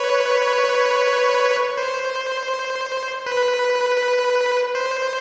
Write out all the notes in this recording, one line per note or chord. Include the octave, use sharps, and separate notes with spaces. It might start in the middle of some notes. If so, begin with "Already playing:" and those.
Already playing: B4 C#5
C5
B4
C5